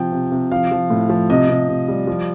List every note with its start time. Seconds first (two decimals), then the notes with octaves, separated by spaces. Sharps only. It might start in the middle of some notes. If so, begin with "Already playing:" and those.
Already playing: C3 F3 G5
0.12 C3
0.32 C3
0.52 F3 F5
0.72 F3
0.90 A2
1.10 F3
1.30 C3 D#5
1.49 C3
1.68 C3
1.88 G3
2.07 F3